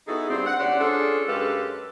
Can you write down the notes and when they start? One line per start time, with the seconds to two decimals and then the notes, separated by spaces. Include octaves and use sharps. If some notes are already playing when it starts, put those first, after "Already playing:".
0.08 B3 D#4 E4 F#4 G#4 A4
0.29 G2 C4
0.46 F#5
0.58 E2 C#4 G4 C5 D5 F#5
0.80 C#4 D4 F4 G#4 A4
1.27 F#2 G#3 G4 A4 B4 F5